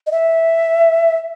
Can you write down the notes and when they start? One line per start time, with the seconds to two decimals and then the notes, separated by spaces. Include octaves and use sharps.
0.07 D#5
0.12 E5